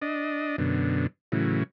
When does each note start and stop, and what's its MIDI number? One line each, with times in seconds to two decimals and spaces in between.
0.02 0.56 62
0.02 0.56 75
0.58 1.07 42
0.58 1.07 47
0.58 1.07 50
1.32 1.63 45
1.32 1.63 49
1.32 1.63 52
1.32 1.63 54